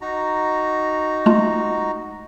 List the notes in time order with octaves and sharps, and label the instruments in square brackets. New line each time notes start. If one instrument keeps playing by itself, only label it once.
[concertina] D#4 F#4 A#5
[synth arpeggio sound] G#3 A3 F4